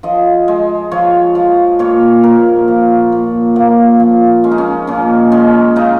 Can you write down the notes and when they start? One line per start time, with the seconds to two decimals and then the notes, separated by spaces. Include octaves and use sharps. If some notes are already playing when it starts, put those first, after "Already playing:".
0.03 F3 D#5
0.48 G#3
0.91 F3 C#5
1.35 F3
1.79 A#2 C#5
2.23 A#2 A#4
2.68 F3
3.12 A#2
3.56 F3 A#3
4.00 F3
4.44 G#3 C#4
4.51 D#4
4.58 C#4
4.87 A#2 C#4
5.32 G#3 C#4
5.76 C#3 D#4